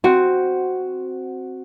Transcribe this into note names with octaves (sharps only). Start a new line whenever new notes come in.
C4 F#4